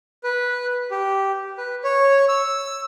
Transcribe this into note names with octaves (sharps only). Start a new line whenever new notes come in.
B4
G4
B4
C#5
E6